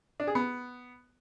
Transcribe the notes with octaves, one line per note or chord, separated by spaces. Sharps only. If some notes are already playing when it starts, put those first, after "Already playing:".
D4
G#4
B3